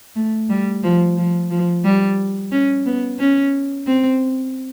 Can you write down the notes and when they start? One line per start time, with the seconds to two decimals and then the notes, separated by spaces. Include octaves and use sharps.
0.16 A3
0.49 G3
0.83 F3
1.17 F3
1.50 F3
1.84 G3
2.51 C#4
2.86 B3
3.19 C#4
3.86 C4